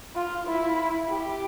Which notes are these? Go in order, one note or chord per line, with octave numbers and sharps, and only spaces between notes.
F4
E4
G4